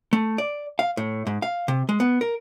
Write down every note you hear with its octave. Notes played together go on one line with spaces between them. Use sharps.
A3
D5
F5
A2
G#2
F5
C3
G#3
B3
A#4